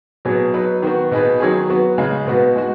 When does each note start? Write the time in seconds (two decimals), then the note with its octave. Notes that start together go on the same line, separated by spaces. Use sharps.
0.25 B2 F#3 B3 G#4
0.54 F#3 D#4 B4
0.82 D#3 B3 F#4
1.11 B2 B3 D#4 G#4 B4
1.40 D#3 F#3 C#4 G#4
1.69 F#3 B3 F#4 B4
1.98 C#3 G#3 D#4 G#4
2.26 B2 B3 D#4 F#4 B4
2.55 G#3 D#4 F#4